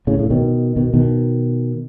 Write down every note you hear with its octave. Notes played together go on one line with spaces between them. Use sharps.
A2 C#3
A2 C#3
B2 D#3
B2 D#3
B2 D#3